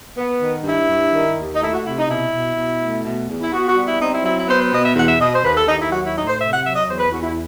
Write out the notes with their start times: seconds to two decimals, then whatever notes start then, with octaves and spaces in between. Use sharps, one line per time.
0.16 B3
0.40 D#3
0.63 G2 E4
0.88 G2
1.11 D#3
1.36 D#2
1.52 D#4
1.59 A3 E4
1.72 F#4
1.83 C3 E4
1.95 D#4
2.07 B2 E4
2.31 B2
2.55 B2
2.79 A3
3.03 B2
3.27 E2
3.40 E4
3.51 B3 F#4
3.66 F#4
3.75 G3
3.83 E4
3.99 C4 D#4
4.10 E4
4.23 F#3 E4
4.35 E4
4.47 B3 C5
4.58 C5
4.70 B2 D#5
4.82 E5
4.94 E2 F#5
5.06 E5
5.18 B2 D#5
5.31 C5
5.42 D#2 B4
5.55 A4
5.66 D#2 D#4
5.78 E4
5.90 F#3 F#4
6.02 E4
6.14 A2 D#4
6.26 C5
6.38 C3 E5
6.50 F#5
6.62 F#3 E5
6.74 D#5
6.86 E2 C5
6.98 B4
7.10 E2 F#4
7.21 E4